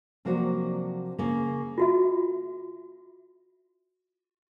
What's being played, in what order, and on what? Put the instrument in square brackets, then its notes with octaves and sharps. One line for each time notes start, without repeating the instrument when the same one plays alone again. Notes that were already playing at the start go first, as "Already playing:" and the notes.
[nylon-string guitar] C3 F3 F#3 A#3 D4 F#4
C#3 A#3 C#4
[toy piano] F4 F#4 E5